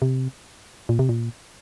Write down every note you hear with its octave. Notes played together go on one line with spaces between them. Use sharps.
C3
A#2
C3
A#2